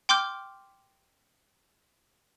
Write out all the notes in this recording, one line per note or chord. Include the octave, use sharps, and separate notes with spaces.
G5 C6 D6 F6 G6